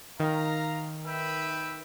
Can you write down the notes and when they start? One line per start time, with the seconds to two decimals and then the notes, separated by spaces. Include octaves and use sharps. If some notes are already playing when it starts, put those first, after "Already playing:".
0.20 D#3 F5 A#5
1.05 B4 E5 G5